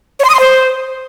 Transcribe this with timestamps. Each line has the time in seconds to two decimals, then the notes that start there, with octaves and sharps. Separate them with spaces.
0.20 C#5
0.25 C6
0.30 D#6
0.35 C6
0.40 C5